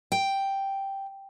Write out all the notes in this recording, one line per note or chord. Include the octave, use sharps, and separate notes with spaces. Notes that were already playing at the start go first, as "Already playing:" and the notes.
G5